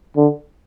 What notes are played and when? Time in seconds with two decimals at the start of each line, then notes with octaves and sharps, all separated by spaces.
0.17 D3